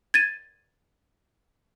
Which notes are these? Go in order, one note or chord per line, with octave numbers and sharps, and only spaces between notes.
G#6 A6 D#7